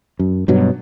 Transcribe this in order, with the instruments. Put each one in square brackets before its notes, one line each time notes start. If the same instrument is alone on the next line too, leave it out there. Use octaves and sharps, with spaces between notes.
[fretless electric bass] F#2
G2 B2 F#3